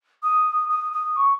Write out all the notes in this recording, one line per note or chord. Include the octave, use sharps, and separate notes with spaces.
D#6
D#6
D#6
C#6